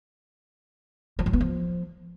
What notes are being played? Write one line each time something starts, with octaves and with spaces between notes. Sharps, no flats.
F3
F#3
B3
F3